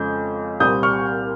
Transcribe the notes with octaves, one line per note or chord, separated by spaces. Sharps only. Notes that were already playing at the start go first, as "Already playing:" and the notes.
Already playing: F2 C#3 G#3 G6
C2 A#2 G3 C4 D#6 G6
C#6 F6